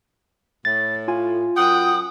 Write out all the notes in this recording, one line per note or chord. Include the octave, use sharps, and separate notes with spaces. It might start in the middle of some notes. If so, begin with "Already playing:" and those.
A2 A6
F4 G#5
F#2 F#5 G5 D#6